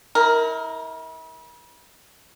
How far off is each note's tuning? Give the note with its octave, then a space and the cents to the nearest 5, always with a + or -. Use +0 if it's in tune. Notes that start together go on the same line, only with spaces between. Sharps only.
E4 -40 A#4 +0